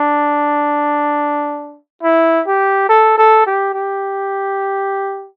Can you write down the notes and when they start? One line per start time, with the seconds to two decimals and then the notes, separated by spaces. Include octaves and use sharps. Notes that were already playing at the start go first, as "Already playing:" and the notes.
Already playing: D4
2.03 E4
2.47 G4
2.89 A4
3.17 A4
3.46 G4
3.74 G4